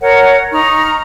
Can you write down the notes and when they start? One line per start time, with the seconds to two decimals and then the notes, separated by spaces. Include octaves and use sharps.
0.01 A#4 C#5 F#5
0.51 D#4 A#5 C#6 F6